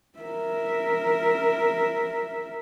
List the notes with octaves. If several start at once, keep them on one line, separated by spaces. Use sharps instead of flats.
A#4 E5